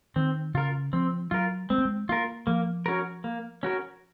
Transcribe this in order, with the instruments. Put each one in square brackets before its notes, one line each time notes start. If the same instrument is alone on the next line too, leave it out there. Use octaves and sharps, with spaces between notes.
[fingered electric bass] D#3 [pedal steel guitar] C4
[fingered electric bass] C#3 [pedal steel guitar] F4 A#4
[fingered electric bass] F3 [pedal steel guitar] C4
[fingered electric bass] F#3 [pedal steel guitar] F4 A#4
[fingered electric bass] G#3 [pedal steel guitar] C4
[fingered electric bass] A#3
G#3
[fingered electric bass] A#3 [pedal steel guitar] F4 A#4
[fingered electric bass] F3 [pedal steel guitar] A#3
[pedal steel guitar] C#4 F#4 A#4
A#3
C#4 F#4 A#4